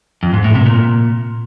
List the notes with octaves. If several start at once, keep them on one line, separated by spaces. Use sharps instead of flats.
F2
G#2
A2
C3
A#2